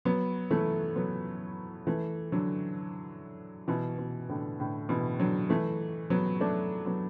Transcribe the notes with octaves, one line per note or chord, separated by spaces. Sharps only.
F#3 B3
E3 A3
F#3 B3
E3 A3
D3 F#3
B2 E3
B2
A2 D3
A2 D3
B2 E3
D3 F#3
E3 A3
F#3 B3
A3 D4
F#3 B3